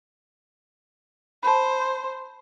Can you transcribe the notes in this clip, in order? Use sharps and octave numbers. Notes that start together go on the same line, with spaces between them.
C5 A5 B5